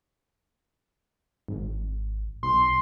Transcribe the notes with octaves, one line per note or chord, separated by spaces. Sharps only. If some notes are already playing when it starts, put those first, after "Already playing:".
G#1
B1 C6